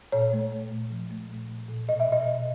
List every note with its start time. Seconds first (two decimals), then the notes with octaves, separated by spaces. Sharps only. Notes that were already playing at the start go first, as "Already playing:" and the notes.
0.12 A#2 C#5
0.33 A3
0.52 A3
0.71 A#2
0.90 F3
1.11 A3
1.30 A#2
1.49 A#2
1.68 A#2
1.88 B2 D#5
2.00 E5
2.08 B2 D#5
2.28 B2